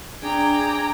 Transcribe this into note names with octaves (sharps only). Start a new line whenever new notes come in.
D4 G#4 G5 A#5 D6 G#6